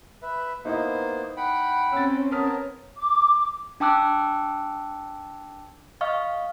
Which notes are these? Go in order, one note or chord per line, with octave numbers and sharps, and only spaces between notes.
B4 E5
A#3 B3 D#4 E4 C5 D#5
F#5 G5 B5
C4 C#4 C#5 E6 A6
B3 A#4 C#5 A5 D#6 F6 B6
D6
D4 G5 A5 D6 E6 F#6
D#5 F5 C#6 F6